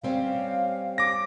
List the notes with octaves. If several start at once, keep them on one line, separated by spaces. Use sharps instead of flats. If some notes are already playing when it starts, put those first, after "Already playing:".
G3 C4 C#4 F5
D6 A#6